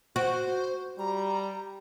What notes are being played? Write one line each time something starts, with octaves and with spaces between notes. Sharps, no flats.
F#4 C5
G3 A#5